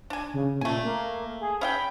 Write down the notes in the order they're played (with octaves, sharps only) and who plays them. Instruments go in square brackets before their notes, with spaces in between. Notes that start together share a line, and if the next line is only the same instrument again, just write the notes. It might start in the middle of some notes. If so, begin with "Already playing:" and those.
[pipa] D4 G#5
[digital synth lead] C#3
[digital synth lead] A#2 [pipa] A3 G#5
[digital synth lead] A#3
G#4
[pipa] C#4 E5 G5 [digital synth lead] B5